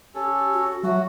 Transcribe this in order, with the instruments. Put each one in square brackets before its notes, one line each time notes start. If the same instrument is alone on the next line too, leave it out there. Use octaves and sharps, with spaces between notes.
[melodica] C#4 A4 [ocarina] G4
[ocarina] F#4
[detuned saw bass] F#3 [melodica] F#4 [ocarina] E5